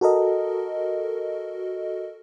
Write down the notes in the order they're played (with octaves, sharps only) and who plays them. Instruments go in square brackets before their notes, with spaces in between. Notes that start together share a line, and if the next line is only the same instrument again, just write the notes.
[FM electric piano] F#4 A4 A#4 D#5